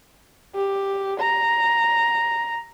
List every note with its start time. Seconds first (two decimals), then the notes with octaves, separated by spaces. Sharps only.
0.55 G4
1.20 A#5